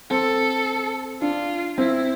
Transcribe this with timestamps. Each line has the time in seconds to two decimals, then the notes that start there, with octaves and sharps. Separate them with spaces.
0.10 C4 A4
1.22 D4 F4
1.78 C4 E4